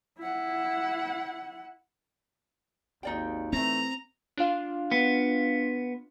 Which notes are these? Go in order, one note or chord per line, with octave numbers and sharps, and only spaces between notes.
E4 F#5
G#1 D#2 D#4 D5 G5
E3 A3 C4 A#5
D4 F4 F5
B3